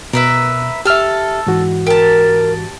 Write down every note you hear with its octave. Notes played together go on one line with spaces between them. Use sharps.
B2 A#4 B4 E5
G4 A4 E5 F6
G#2 E3 F#4
G4 A#4 A5